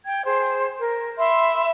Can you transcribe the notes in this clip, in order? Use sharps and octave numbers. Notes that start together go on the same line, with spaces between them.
G5 G#6
G#4 C5
A#4
E5 B5 C6